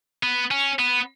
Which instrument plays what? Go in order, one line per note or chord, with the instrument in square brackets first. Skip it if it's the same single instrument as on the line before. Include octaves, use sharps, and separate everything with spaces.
[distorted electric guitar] B3
C#4
B3